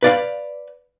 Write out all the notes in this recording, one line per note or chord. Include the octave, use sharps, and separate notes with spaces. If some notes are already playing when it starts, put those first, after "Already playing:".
B4 D5 F5